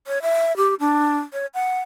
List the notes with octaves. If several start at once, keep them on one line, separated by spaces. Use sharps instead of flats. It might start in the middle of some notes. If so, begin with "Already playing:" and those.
C#5
E5
G4
D4
C#5
F#5